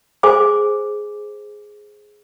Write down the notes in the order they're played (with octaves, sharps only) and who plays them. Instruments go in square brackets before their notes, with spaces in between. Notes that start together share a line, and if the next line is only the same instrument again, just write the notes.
[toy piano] G#4 C5 G#5 D6